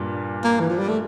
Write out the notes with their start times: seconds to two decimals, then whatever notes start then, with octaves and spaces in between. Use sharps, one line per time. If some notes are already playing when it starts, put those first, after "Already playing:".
Already playing: G2 A#2
0.44 A#3
0.60 E3
0.70 F3
0.78 G3
0.88 A3